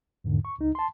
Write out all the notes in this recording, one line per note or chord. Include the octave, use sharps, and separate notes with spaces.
E2 G#2 D3
C#6
C#2 D#4
A5 C6